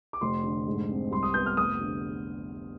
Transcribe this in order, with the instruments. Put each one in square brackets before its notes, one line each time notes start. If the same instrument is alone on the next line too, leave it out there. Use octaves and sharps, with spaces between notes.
[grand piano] D6
F1 C6
D3
G#2
C4
C2 C6
D#6
B3 G6
F6
F1 D#6
D3